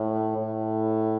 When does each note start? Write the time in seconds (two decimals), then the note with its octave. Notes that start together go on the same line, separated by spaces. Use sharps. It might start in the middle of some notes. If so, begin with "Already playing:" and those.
Already playing: A2
0.37 A2